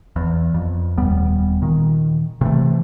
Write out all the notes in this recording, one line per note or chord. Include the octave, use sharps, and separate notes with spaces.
E2
F2
D#1 D#2 G3 B3
A#2 D#3
C3 E3 A3